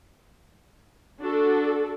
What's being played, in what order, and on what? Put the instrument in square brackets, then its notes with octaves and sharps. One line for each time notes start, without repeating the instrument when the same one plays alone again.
[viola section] D4 F#4 A4